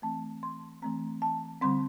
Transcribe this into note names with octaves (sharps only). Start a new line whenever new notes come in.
E3 A3 C4 A5
C6
E3 A3 C4 A#5
A5
D3 G3 C4 C6